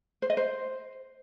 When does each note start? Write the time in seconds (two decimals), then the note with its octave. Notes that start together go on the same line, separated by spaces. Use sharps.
0.22 C5
0.30 D#5
0.37 C5